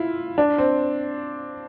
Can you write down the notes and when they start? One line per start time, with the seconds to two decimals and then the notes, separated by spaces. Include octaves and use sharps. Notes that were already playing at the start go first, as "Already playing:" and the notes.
Already playing: E4 F4
0.38 D4
0.58 C4